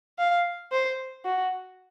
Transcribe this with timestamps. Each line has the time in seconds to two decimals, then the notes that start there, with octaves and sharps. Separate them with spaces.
0.19 F5
0.72 C5
1.25 F#4